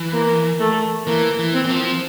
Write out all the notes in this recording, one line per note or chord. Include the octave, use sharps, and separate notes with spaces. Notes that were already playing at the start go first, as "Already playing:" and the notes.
Already playing: E3
A#3
A3
E3 A#3
E3
C4
E3
F3